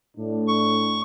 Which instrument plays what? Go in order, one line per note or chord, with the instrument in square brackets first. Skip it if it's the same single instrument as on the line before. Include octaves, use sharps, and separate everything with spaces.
[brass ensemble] A2 D4
[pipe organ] C#6